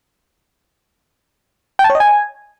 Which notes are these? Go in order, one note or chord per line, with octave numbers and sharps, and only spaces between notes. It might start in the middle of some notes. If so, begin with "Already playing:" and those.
G5
A5
C#5
D#5
G#5